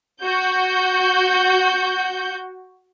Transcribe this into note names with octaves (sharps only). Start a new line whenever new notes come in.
F#4 G6